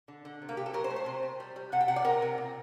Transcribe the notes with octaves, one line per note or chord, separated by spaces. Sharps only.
D3
D3
C3
A#3
C3 G4
A4
F#3 A#4
C5
A3
C5
C3
C3
G3
G3
C3 F#5
G5
C3 F#5
D5
C3 A#4
C3
A#2